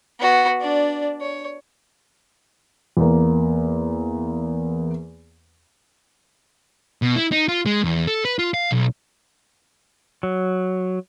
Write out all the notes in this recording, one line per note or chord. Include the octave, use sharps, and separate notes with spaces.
B3 F#4
D4 D5
C#5
E2 A#3
B2
E4
D#4
F4
G#3
E2
A4
B4
F4
F5
B1
F#3